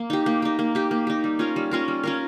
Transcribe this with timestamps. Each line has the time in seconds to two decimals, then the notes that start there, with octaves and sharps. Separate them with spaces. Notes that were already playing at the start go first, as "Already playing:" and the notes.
Already playing: A#3
0.10 D#4 G4
0.26 A#3
0.42 D#4 G4
0.59 A#3
0.75 D#4 G4
0.91 A#3
1.07 D#4 G4
1.24 G3
1.39 C#4 F4 A#4
1.56 G3
1.71 C#4 F4 A#4
1.88 G3
2.03 C#4 F4 A#4